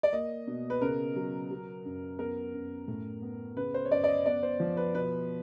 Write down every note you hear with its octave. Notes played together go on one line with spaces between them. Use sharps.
D5
A#3 D#5
B2
B4
C#3 A#4
F#3
F#3
F#2
B3 A#4
F#2
A2
B3
C#3 B4
C5
C#5
F#2 D5
D5
D#5
B3 D5
C5
F3
B4
B2 B4